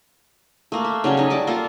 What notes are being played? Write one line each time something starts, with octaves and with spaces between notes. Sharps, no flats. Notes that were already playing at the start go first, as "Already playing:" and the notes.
A3 A#3
E5
C#3 F#3 G3 C#4
C#4 D#4
G3 A5 D6
A#3 F4 A4